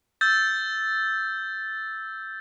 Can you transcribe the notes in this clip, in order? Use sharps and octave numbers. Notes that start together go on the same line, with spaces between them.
E6 G6 A6